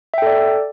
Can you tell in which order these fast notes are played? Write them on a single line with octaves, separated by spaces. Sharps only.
E5 G5 A4 D5